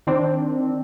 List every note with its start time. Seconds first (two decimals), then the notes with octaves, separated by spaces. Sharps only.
0.07 D#3 C4 D4